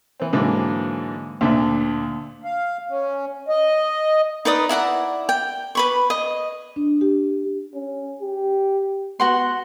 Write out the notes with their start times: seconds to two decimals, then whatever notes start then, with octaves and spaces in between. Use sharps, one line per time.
0.20 E3 C4
0.33 G#2 D3 E3 F#3 A#3
1.41 D2 A#2 D3 E5
2.44 F5
2.89 C#4
3.49 D#5
4.45 D#4 B4 D5 D#6
4.69 E4 D5 F#5 A#5
5.29 G5
5.75 B4 B5 C#6
6.10 D#5
6.76 D4
7.01 G4
7.74 C#4
8.21 G4
9.20 B3 F#4 F#5 C6